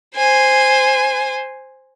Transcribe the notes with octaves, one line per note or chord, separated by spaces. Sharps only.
C5 G#5